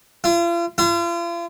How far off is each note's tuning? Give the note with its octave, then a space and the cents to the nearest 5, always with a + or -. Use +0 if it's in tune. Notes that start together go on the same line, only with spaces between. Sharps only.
F4 -40
F4 -40